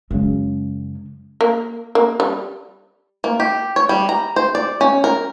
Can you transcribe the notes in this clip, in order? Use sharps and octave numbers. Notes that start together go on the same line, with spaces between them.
F#2 C#3 G#3 C#4
A#3
A#3
G3
A#3
G4
C#5
G3
A#5
C5
D5
C#4
A#4